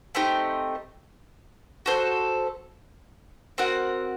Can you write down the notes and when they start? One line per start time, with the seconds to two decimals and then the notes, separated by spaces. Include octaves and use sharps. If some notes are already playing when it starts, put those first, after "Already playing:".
0.15 A3 C4 D#4 G4
1.86 F#4 A4 C5
3.58 C4 F#4 A#4 F#5